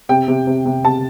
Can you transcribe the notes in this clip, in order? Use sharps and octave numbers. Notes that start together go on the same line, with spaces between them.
C3 G5
C3
C3
C3
C3 A5